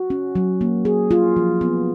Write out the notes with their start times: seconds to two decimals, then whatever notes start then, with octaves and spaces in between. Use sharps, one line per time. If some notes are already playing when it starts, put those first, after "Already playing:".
Already playing: F#4
0.10 C#4
0.35 F#3
0.61 A#3
0.85 G#4
1.11 F4
1.36 F3
1.61 B3